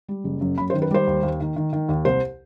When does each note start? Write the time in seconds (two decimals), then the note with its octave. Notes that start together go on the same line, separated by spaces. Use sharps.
0.08 G3
0.24 F#1
0.41 F#2
0.58 F#2 B5
0.70 C5
0.74 D#3
0.82 B4
0.91 G3 C5
1.07 D#2
1.23 D#2
1.40 D#3
1.56 D#3
1.73 D#3
1.89 D#2
2.05 C2 C5